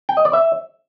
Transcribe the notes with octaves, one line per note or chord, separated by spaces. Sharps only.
G5
D#5
D5
E5